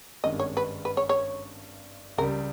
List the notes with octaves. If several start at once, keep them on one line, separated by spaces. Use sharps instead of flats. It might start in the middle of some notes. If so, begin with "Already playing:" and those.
G#1 G2 D#3 G#3 C#4 D#5
C#5
B4
B4
C#5
C#5
C#2 C#3 G3 A#4